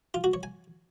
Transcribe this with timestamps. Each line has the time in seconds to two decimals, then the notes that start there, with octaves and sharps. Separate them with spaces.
0.14 F4
0.24 F#4
0.34 C#5
0.43 G#5